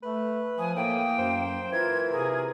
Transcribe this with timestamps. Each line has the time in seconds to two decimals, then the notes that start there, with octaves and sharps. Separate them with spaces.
0.03 A3 B4
0.58 F3 G#5 D#6
0.76 A2 A#3 G5
1.19 F#2 C5
1.73 E3 F4 A#4 G#6
2.12 C3 G#4 A#4